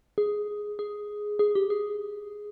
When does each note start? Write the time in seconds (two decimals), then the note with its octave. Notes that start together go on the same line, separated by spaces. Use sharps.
0.18 G#4
0.79 G#4
1.39 G#4
1.55 G4
1.70 G#4